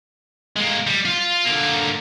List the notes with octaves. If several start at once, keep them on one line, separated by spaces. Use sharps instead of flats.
G#3 A#3
G3
F4
D3 A#3